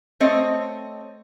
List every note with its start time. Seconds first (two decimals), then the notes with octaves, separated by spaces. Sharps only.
0.20 A3 C4 C#5 D#5